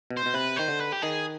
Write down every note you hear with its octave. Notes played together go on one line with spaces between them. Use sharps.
B2
C5
B2
C3 B4
D#3 C5
D3
B4
G4
D#3 G#4